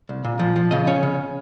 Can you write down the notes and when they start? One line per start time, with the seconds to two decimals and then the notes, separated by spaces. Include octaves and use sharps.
0.09 C2
0.24 A#2
0.39 F3
0.56 F3
0.71 C#3 D#5
0.87 C#4 C#5
1.03 C#3